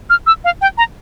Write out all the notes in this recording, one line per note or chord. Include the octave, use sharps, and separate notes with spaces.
F6
E6
F5
G5
A#5